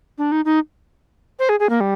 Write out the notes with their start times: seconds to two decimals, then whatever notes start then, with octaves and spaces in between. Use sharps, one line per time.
0.18 D4
0.32 D#4
0.45 D#4
1.39 C5
1.49 G#4
1.60 G#4
1.69 A#3
1.80 G3